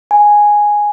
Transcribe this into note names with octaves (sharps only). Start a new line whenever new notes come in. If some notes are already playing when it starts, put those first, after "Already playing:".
G#5